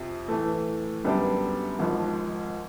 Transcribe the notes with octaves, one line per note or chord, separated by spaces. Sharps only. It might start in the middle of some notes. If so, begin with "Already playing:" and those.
Already playing: F2 C3 F3
A2 E3 A3
F#2 D3 G3 B3 D4
G#1 G#2 F3